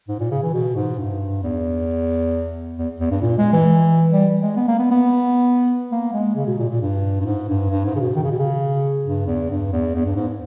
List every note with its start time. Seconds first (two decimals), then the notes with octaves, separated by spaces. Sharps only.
0.08 G#2
0.20 A#2
0.31 C#3
0.43 E3
0.53 B2
0.76 G#2
0.98 G2
1.43 E2
2.78 E2
3.00 E2
3.11 G2
3.22 A#2
3.38 G#3
3.53 E3
4.13 G3
4.41 G#3
4.56 B3
4.68 A#3
4.79 B3
4.91 B3
5.91 A#3
6.13 G#3
6.36 C#3
6.47 B2
6.59 A#2
6.69 A#2
6.81 G2
7.21 G2
7.25 G#2
7.48 G2
7.71 G2
7.85 G#2
7.96 C#3
8.00 B2
8.15 D#3
8.23 C#3
8.32 B2
8.39 C#3
9.05 G2
9.27 E2
9.50 G2
9.72 E2
9.95 E2
10.06 G2
10.16 G#2